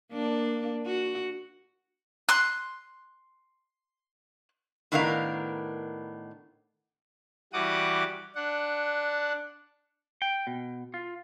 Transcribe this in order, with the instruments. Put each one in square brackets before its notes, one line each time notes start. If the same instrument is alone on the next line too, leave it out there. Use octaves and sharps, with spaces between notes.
[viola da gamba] A#3 D4
F#4
[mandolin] C6 F#6
[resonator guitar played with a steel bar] A2 D#3 B3 D4 A#4 F5
[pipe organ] E3 G3 F#4 F#5 D6 D#6
D4 F#5
[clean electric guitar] G5
B2
F4